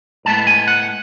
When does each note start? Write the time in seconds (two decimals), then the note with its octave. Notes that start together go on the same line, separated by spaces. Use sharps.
0.25 A2 G#3 B3 A5
0.47 G#5
0.68 F#5